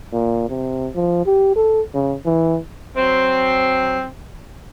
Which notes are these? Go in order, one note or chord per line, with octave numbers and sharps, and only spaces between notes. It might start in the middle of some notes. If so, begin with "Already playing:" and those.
A#2
C3
F3
G4
A4
C#3
E3
F#3 C4